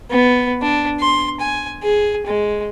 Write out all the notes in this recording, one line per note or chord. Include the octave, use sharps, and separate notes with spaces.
B3
D4
C6
G#5
G#4
G#3